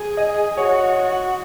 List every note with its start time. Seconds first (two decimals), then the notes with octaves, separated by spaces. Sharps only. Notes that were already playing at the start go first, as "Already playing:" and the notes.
Already playing: G#4
0.17 D#5
0.57 F#4 C#5
0.97 F#4